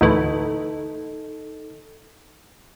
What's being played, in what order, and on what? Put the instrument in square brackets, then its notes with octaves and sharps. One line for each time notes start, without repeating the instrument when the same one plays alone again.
[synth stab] D2 A2 E3 [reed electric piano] D#4 A4